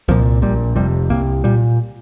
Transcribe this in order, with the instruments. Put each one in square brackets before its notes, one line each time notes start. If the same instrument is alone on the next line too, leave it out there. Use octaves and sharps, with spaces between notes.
[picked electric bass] C2 A#2 F3
A#1 A#2 G3
F1 F2 C3 G3
C2 C3 A#3
A#2 G3